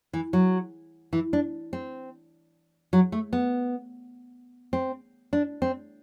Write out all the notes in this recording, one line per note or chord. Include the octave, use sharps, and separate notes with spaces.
E3
F#3
E3
D4
C4
F#3
A3
B3
C4
D4
C4